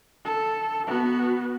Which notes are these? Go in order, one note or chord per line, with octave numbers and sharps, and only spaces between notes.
A4
B3 F#4